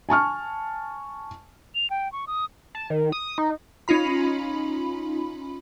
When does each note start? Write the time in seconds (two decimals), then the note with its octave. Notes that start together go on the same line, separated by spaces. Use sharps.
0.09 G#5 A5 C#6 F6
1.75 F7
1.90 G5
2.12 C#6
2.27 D#6
2.75 A5
2.90 D#3
3.12 D#6
3.38 D#4
3.88 C#4 D#4 F4 B5